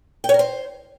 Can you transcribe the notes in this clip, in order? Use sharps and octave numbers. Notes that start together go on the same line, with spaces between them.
G5
C#5
A#4
C5